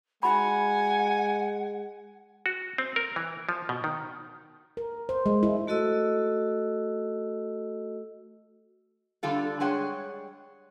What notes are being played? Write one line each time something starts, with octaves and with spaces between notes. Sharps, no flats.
G#3 D#4 F#4 F#5 G#5 B5
F#4
C4
A#4
E3
F3
B2
D#3
A#4
C5
G#3
E4
A3 F#4 A4 D#5 E6
D3 G3 F4 A4
G3 G#3 G#4 C#5 F#5 G5